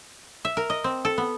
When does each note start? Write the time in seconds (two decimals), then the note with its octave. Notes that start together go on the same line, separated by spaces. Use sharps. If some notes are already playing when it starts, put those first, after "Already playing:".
0.45 E5
0.57 A#4
0.70 D#5
0.84 C4
1.05 A4
1.18 B3